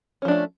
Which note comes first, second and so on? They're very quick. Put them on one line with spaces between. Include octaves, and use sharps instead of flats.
C#4 F3 D4 A3